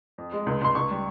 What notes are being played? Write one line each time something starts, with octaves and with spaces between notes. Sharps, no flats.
F2
G#3
C#2
C#2 C6
C#2 C#6
G3